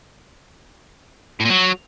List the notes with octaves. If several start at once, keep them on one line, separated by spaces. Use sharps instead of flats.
A2
A#2
F#3